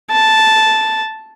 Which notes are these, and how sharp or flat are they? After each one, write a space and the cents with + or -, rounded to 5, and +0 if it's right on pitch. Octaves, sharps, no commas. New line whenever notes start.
A5 -5